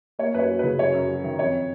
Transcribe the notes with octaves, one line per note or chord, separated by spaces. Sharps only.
A#3 C#5
F#2 B4
C#5
F#3
B4
C#3
F#2 C#5
F#2
F#3
D#3
F2 C#5